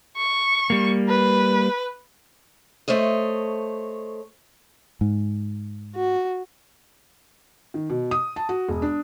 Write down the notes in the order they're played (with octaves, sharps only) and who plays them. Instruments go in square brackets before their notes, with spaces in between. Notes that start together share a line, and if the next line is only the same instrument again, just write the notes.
[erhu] C#6
[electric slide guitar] G3 A#3
[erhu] B4
[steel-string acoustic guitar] A3 C5 C#5 D#5
[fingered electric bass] G#2
[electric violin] F#4
[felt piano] D#3
B2
D#6
A5
F#4
E1
D4